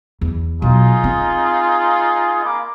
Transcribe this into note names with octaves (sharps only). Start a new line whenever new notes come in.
E2
B2 F#3 D#4 F4 G#4
C4
A#3 B5 D6